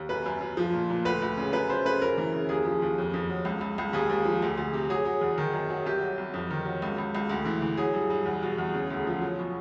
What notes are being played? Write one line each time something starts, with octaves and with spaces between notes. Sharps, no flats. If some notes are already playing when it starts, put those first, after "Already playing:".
Already playing: D#2
F#2 B4
F#2
F#2
F3
A#2
A#2
D2 B4
D2
C#3
F#2 B4
F#2 C5
C#3 B4
F#2 A#4
E3
C#3
D#2 G#4
F3
D#2
F2
F2
F#3
C#2
C#2
C#2
D#2 G#4
D#2
F3
D2
D2
C3
F#3 G#4
F#3
E2
D#3
F#2
F#3
C2 G4
F#3
C2
F2
D#3
F#3
C#2
C#2
C#2
D2
E3
E3
F#3 G#4
G2
G2
E2
B2
E2
C#3
D2
F3
F#3
B2